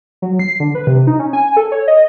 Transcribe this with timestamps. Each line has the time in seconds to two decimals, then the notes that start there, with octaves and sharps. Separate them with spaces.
0.22 F#3
0.39 C7
0.60 D3
0.75 B4
0.87 C3
1.07 D#4
1.19 C#4
1.33 G#5
1.57 A4
1.72 C#5
1.88 D#5